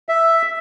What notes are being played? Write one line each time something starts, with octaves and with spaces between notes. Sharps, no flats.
E5